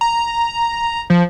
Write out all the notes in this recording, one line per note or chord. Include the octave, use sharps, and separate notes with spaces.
A#5
F3